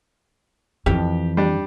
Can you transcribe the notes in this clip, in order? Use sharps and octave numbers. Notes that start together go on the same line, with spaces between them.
F2 E3 G4
G3 D4